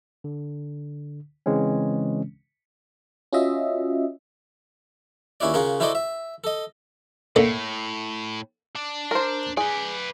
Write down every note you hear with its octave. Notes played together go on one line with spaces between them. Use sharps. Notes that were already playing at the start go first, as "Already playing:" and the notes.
D3
C#3 E3 G#3 C4 C#4
C#4 F4 F#4 D#5 E5
D#2 C#4 E4 F#4 D5
C#3 F4 F#4 G#4 A#4
E4 F#4 A4 C5 D5 D#5
E5
A4 D#5
A2 D3 A#3
D4
A#4 C5
G#4 B4 D5